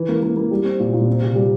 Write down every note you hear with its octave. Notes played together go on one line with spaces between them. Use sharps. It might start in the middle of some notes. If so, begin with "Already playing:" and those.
Already playing: E3
A#3
A#3
A#3
G3
C4
A#2
A#2
C4
C3
G3